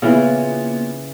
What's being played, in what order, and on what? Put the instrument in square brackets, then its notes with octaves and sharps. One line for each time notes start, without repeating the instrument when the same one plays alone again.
[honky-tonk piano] A#2 B3 [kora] C#3 E3